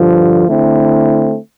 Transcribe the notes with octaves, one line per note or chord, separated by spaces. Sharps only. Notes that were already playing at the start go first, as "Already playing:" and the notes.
Already playing: G2 D3 F3
D3 A3 C4 E4